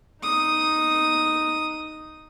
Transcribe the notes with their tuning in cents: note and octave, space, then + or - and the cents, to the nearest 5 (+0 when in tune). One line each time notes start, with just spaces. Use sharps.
D#4 +0 D#6 +0